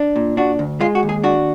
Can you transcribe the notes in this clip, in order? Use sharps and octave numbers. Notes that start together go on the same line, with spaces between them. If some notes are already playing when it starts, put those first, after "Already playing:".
Already playing: D4
A#2
D4 F#4
D2
G#3 F4
F#4
D#2
G#4
D4 F#4